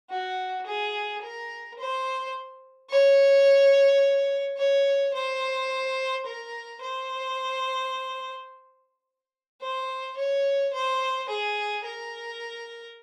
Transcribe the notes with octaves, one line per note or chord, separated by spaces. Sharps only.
F#4
G#4
A#4
C5
C#5
C#5
C5
A#4
C5
C5
C#5
C5
G#4
A#4